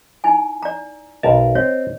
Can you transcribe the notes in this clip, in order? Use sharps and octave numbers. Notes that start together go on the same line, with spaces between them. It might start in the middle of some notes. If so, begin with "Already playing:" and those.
D#4 E4 G#5
D5 A#5
B1 A#4 D#5 A5
C4 C#5